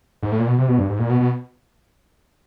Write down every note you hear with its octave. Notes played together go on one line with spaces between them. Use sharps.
G#2
A2
A#2
B2
C3
B2
G2
G#2
A#2
B2
B2